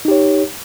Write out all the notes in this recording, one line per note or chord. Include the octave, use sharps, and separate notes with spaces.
D#4 G4 C#5